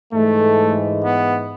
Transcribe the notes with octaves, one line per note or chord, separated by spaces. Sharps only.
G#2 E3 G#3 A3
B3